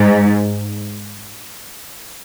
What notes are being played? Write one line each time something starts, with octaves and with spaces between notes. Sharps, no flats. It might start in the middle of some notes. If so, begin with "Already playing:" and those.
Already playing: G#2